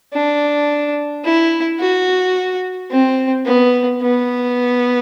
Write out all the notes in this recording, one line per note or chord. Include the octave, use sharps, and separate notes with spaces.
D4
E4
F#4
C4
B3
B3